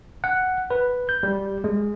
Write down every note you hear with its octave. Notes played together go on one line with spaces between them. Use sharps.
F#5
B4
G6
G3
G#3